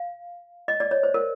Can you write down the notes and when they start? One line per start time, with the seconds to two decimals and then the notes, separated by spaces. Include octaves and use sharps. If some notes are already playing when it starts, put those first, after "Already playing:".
Already playing: F5
0.68 D#5
0.80 D5
0.91 C#5
1.03 C5
1.14 A#4